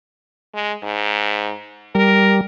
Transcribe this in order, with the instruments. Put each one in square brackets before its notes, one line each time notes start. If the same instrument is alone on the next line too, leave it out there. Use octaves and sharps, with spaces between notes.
[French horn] G#3
G#2
[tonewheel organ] G3 [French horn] A#4